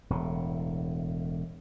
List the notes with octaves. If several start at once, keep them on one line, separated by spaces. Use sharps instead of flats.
E1 A2